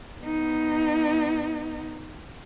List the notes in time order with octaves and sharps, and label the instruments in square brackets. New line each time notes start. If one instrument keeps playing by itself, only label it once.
[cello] B3 D#4